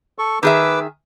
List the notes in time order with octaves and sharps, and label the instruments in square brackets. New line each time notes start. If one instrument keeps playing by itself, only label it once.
[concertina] A4 C#6
[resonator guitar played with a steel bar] D#3 G#4 E5 [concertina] B4 D6 E6